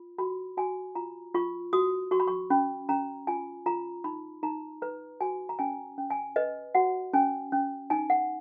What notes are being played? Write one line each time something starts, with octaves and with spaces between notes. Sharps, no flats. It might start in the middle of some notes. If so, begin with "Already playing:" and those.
Already playing: F4
F#4 B5
F#4 G#5
F4 A#5
F4 C#6
F#4 D#6
F#4 C#6
B5
C#6
C#4 B5
C#4 A#5
F4 G#5
F4 A#5
D#4 B5
D#4 A#5
B4 A#5
F#4 G#5
A#5
C#4 G#5
C#4
G#5
B4 D#5
F#4 F#5
C#4 G#5
C#4
D#4 G#5
F#5